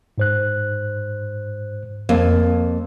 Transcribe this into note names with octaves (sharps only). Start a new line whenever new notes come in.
G#2 C5 F#6
F2 A#3